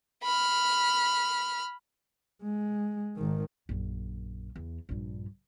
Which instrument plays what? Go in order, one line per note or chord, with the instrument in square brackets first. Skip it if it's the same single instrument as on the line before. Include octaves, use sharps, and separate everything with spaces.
[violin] B5 F6
[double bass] G#3
G#1 D#3
[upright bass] A#1 F#2
E2
A#1 G2